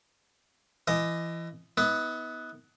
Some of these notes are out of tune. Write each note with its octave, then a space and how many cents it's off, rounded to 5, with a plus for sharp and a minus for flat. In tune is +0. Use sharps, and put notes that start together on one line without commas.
E3 +25 D#5 +0
B3 +0 D#4 +45